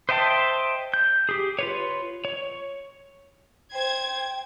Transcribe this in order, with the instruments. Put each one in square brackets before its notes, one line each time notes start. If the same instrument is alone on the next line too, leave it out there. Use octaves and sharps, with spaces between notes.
[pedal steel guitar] C5 D#5 E5 G5 A5
G6
G4 G#4
F4 B4 C#5
C#5
[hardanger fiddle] C5 [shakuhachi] G5 [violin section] G#6